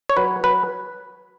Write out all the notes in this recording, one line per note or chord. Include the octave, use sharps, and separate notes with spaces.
C#5
F#3 B4
F#3 B4